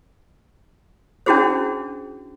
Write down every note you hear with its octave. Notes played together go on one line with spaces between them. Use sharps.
C#4 D4 E4 F#4 G#4 C5